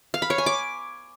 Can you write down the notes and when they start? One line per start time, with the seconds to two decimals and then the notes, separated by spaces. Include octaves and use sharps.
0.14 F5
0.22 B5
0.30 C#5
0.38 G#5
0.46 D6